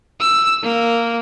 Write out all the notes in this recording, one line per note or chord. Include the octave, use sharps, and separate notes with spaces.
E6
A#3